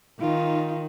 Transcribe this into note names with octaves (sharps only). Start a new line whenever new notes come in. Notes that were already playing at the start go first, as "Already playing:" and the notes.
D#3 D#4 F4